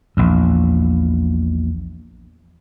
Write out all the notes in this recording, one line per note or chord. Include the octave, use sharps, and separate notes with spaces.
A#1 E2